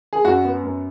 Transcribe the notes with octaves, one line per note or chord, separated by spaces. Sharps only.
G#4
F#2 F#4
B3
F#2